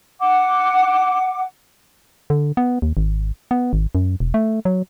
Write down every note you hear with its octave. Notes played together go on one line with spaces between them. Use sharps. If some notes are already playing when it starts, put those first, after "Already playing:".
F#5 D6
D3
B3
D#2
G#1
B3
G#1
F#2
E1
A3
F#3